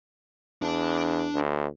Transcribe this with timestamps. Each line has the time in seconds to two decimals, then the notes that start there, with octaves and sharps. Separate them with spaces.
0.62 E2 D4 A5
1.34 D2